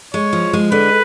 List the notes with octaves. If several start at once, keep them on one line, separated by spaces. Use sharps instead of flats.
G#3 C#5
F3
G#3
D3 B4